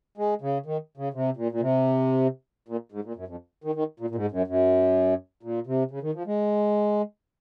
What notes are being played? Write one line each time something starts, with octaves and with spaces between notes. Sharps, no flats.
G#3
C#3
D#3
C#3
C3
A#2
A#2
C3
A#2
G#2
A#2
F#2
F2
D#3
D#3
A#2
A#2
G#2
F#2
F#2
A#2
C3
C#3
D#3
F3
G#3